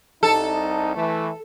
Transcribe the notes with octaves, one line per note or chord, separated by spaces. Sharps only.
C2 D#4 A4
E3 A3